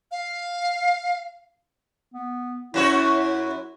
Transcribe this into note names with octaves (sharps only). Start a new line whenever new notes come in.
F5
B3
F#2 E4 F#4 C#5